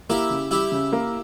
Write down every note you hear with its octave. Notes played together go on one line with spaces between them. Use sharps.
A#3 E4 G4
C#3
G3 E4 G4
C#3
A#3